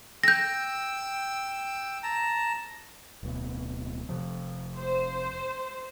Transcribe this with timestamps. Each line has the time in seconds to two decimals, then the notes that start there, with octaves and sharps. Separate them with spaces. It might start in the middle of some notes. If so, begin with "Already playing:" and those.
0.23 G5 E6 G6 A#6
2.03 A5 A#5
3.23 D1 B2
4.09 F1 C3 F3
4.78 C5